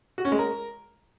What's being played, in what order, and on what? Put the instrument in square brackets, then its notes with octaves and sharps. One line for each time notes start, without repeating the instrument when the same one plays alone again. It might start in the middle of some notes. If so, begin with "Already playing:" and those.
[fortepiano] F#4
C#4
G#3
A#4